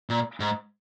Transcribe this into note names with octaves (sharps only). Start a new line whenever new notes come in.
A#2
G#2